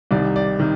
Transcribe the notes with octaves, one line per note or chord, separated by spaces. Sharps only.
C2 C3 D#3 D5
D5
C3 D#3